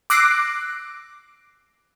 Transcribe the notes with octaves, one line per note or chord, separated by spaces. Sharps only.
D6 E6 F#6 A#6 C7 D7